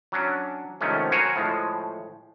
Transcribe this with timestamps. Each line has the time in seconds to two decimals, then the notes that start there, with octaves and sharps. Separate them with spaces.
0.12 F#3 C#4 D4
0.81 G#2 C3 D#3 F3 A3 C#4
1.11 F#4 A#4 C5 C#5 F#5 G#5
1.36 A2 F3 G#3